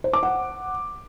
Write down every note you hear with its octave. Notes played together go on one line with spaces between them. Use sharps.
C5
D6
F#5